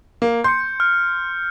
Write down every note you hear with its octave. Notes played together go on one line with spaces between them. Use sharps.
A#3
C6 G6 C#7
F6